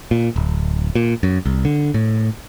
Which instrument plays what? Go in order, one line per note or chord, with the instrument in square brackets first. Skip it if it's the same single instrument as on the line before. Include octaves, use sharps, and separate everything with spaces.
[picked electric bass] A#2
D1
A#2
F#2
C2
D3
A2